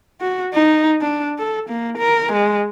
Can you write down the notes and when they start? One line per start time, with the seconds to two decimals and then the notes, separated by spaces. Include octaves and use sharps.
0.21 F#4
0.54 D#4
1.02 D4
1.39 A4
1.69 A#3
1.98 A#4
2.32 G#3